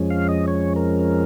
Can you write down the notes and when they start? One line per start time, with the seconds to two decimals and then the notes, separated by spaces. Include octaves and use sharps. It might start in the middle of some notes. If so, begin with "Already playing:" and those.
Already playing: F2 F3 G#3 C#4
0.10 F5
0.29 D#5
0.48 C#5
0.76 A#4